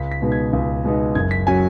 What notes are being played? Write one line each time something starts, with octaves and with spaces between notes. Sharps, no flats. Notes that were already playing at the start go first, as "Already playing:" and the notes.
Already playing: C#2 B6
B6
B2 G#3 B3 D#4
G#6
C#2
B2 G#3 B3 D#4
F#1 G#6
B6
F#3 C#4 G#5